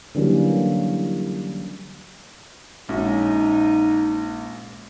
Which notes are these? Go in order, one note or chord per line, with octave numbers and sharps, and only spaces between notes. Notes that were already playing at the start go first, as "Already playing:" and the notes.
D3 E3 F#3 G3 A#3 C#4
A#1 G#3 C#4 D#4 F#4